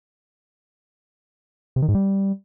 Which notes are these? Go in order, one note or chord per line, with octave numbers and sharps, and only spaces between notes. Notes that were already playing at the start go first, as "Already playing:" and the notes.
C3
D#3
G#2
G3